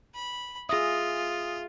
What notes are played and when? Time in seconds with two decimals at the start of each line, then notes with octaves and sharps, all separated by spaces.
0.15 B5
0.69 F4 G#4 E5 D#6 A#6